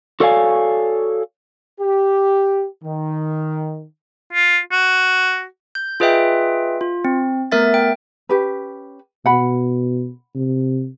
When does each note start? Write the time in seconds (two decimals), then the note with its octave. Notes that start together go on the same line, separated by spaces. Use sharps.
0.20 F#4 A4 C#5 D5 F5 G#5
1.79 G4
2.84 D#3
4.33 F4
4.72 F#4
5.75 G6
6.00 F4 G#4 B4 D#5 E5 G5
6.81 F4
7.05 C4
7.52 A3 B3 A#4 E5 A6
7.74 G5
8.29 C#4 G4 B4
9.26 B2 F#5 B5
10.35 C3